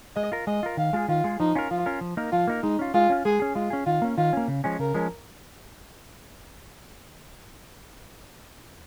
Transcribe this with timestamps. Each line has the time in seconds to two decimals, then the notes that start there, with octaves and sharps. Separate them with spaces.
0.16 G#3 D#5
0.32 F4 A#4
0.47 G#3 D#5
0.63 F4 A#4
0.77 D#3 F5
0.93 G#3 F4 G#4
1.08 D#3 F4
1.24 G#3 F4 G#4
1.40 F3 D#4
1.55 C#4 F4 A#4
1.71 F3 F4
1.86 C#4 F4 A#4
2.01 F3
2.17 A#3 D#4 A#4
2.32 F3 F4
2.48 A#3 D#4 A#4
2.63 G#3 D#4
2.79 C#4 F4
2.94 G#3 F4
3.10 C#4 F4
3.25 G#3 G#4
3.40 C#4 G#4
3.55 G#3 F4
3.70 C#4 G#4
3.86 D#3 F4
4.02 A#3 C#4
4.17 D#3 F4
4.33 A#3 C#4
4.48 C#3
4.64 F3 G#3 C#4
4.79 C#3 A#4
4.94 F3 G#3 C#4